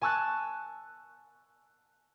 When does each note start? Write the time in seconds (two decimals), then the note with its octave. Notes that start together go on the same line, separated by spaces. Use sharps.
0.01 G#5 A5 C#6 E6 F#6 A6